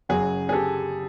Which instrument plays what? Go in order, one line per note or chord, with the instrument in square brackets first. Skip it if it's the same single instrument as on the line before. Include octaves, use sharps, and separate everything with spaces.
[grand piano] F#1 F#2 C#3 F#3 F#4 G#4
G#4
G4 A4